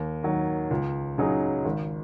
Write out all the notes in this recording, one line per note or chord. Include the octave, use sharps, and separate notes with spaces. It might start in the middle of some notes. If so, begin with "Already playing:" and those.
Already playing: D#2
D#3 F#3
C#2
C#3 F#3 D#4 G#4
G#1